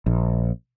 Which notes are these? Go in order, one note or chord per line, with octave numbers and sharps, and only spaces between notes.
A#1